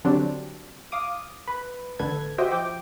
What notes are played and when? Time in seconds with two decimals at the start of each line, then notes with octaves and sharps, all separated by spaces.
0.04 D3 F#3 C4 D4 G4
0.92 F5 D6 D#6
1.47 B4
1.99 A1 D3 A4 B4 G#6
2.38 F#4 G4 C5 D#5 E5 G5
2.51 F3 G5 D6